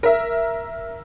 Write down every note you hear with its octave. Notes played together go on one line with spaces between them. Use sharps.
A#4 E5